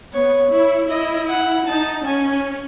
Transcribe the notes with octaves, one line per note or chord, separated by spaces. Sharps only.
B3 C#5
E4 C#5
E4 D#5
F#5
D#4 A5
C#4 G#5